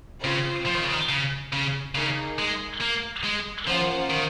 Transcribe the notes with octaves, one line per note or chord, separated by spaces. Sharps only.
C#3 C4 F4 C5
F3
D#3
C#3
D#3
C#3
C#3
C#3 A#3 D#4 G#4
G#3
A#3
G#3
F3 A#3 C#4 F4 C5 F#5
D#3